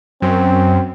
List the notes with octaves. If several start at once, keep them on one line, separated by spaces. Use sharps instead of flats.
F#2 C4